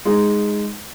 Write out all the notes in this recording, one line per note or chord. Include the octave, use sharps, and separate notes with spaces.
G#3 D#4